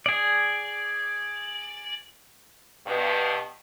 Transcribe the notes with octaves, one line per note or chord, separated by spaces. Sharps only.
G#4 D5
G2 B2